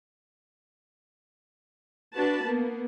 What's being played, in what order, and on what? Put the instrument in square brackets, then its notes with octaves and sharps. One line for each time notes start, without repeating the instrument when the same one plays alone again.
[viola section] D4 F#4 B4 A5
A#3 B3